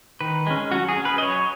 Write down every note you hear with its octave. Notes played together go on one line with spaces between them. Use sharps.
D#3 B4
G#3 C#4
F#3 F#4
G#4
C#4
B4
D#5
F#3 C#5